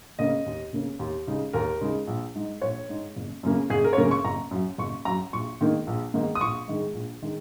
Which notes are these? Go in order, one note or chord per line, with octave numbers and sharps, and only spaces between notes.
C#3 A#3 C#4 D#5
D#2
C#3 A#3 C#4
D#2
C#3 G#3 D#4
D#2 A#4
C#3 G#3 D#4
A#1
G#2 G#3 D#4
A#1 C#5
G#2 G#3 D#4
F#1
F#2 C#3 A#3 C#4
F#1 G#4
A#4
C#5
F#2 C#3 A#3 C#4 A#4
C#6
F#1 A#5
F#2 F#3
F#1 C#6
F#2 F#3 A#5
A#1 C#6
G#2 D#3 A#3 D#4
A#1
G#2 D#3 A#3 D#4
D#6
A#1 C#6
G#2 D#3 G#3
A#1
D#3 G#3